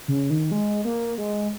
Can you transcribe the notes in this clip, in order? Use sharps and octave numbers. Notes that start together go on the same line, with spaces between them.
C#3
D#3
G#3
A#3
G#3